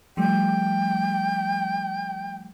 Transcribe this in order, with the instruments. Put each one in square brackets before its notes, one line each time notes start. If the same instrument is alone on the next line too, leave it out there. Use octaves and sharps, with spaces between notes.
[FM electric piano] F3 G3 A3 [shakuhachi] G5